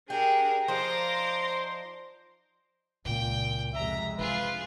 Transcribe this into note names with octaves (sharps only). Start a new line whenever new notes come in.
D4 G4 G#4 A#4
F3 D4 D#4 C5 A#5 C6 D6
C#2 A#2 G5
F2 C3 G#3 E5 A#5
E3 D4 F4 G#4 B4